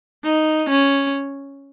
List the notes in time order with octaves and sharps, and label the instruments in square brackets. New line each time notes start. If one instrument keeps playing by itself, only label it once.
[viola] D#4
C#4